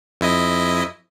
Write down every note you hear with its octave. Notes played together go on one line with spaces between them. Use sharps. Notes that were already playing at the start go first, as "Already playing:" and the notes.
F2 E4 D#5